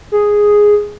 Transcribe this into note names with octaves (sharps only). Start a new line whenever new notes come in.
G#4